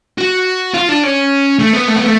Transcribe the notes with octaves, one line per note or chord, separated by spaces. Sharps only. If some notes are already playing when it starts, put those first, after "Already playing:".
F#4
F4
D4
C#4
A3
B3
A3
B3
A3